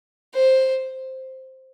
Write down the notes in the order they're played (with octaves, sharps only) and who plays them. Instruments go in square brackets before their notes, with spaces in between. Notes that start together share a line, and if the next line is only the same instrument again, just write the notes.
[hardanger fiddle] C5